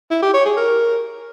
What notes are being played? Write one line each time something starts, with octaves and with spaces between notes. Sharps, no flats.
E4
G4
C#5
G#4
A#4